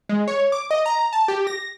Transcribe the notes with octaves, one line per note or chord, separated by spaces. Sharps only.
G#3
C#5
D6
D#5
A#5
A5
G4
A#6